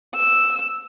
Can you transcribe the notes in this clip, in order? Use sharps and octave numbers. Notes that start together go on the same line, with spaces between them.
E6